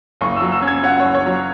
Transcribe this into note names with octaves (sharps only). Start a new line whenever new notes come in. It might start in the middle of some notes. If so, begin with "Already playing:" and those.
F#1 C#6
E6
F#3
E6
C#4
G#6
C#4 F#5
C#5
F#1
C#5
F#3